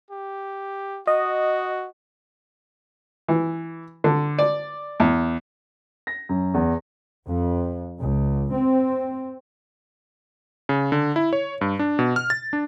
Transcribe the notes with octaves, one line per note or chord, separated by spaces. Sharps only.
G4
F#4 D#5
E3
D3
D5
E2
A#6
F#2
E2
F2
C#2
C4
C#3
D3
E4
C#5
G2
D4
B2
F6
A6
D4